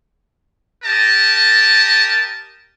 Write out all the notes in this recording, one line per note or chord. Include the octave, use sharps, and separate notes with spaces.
G4 A#4 D#5 A5